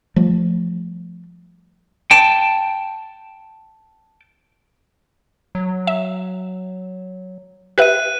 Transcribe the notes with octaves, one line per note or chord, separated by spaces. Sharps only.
F3 G3 A3
G5 A5
F#3
E5
G4 B4 E5 F#6 D#7